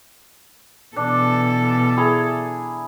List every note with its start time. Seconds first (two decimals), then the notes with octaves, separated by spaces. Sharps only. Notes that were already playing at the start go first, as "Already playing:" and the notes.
0.96 B2 E3 D4 A4
1.97 E4 G#4 A#5